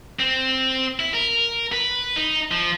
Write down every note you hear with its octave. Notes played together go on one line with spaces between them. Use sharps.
C4
E4
A#4
B4
D#4
F3